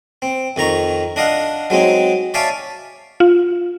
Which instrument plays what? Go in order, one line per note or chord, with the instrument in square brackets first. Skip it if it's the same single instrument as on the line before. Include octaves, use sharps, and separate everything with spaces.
[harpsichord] C4
F2 D#3 A#5 C#6
D4 D#5 F5 F#5
F#3 G#3 C4 D#4
C#5 D5 E5 F5 G#5 A5
[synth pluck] F4